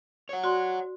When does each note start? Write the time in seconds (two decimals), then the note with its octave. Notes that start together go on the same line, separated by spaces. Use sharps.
0.29 C#5 F#5
0.44 F#4 D5 C6